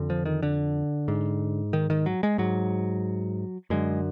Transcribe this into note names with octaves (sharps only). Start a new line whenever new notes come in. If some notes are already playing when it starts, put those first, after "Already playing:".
Already playing: F2 D3
F3
D#3
D3
G#2
D#3
D#3
F#3
G#3
G#2 F#3
F#2 D3 G#3